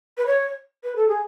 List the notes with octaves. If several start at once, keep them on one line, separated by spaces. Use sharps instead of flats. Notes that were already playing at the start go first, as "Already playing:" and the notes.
B4
C#5
B4
A4
G#4